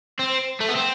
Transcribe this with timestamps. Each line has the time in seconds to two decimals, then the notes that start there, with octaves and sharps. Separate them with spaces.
0.19 C4
0.61 A3
0.69 B3
0.76 C4